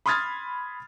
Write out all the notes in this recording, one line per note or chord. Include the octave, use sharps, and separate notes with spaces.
B5 C6 D#6 F6 G#6 A6